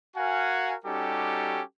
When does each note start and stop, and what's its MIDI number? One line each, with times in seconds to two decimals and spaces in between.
0.16 0.74 66
0.16 0.74 70
0.16 0.74 77
0.16 0.74 78
0.16 0.74 80
0.85 1.61 55
0.85 1.61 61
0.85 1.61 63
0.85 1.61 66
0.85 1.61 67
0.85 1.61 69